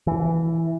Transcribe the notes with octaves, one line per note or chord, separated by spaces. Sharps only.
E3